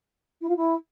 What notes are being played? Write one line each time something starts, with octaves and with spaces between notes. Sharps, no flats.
E4
F4
E4